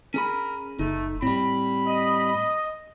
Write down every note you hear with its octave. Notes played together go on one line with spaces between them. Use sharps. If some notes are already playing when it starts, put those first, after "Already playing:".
C#4 G#4 A#4 B5
F#1 A3 D#4
A2 G3 C4 B5
D#5